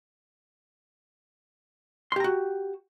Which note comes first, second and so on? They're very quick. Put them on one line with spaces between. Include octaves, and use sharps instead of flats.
C6 G4 A#5 F#4